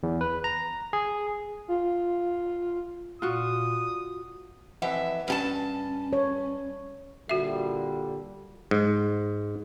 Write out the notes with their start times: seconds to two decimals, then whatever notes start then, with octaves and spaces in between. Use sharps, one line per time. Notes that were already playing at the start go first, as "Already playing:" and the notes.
0.03 E2
0.21 B4
0.44 A#5
0.93 G#4
1.68 F4
3.22 A#2 F4 F#4 D#6
4.82 F2 E3 E5 F#5
5.28 G2 C#4 G4 A5
6.13 C#5
7.29 A#2 D3 G3 F#4 E5
8.71 G#2